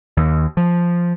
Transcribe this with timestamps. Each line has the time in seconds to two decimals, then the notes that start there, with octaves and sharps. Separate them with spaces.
0.17 D#2
0.57 F3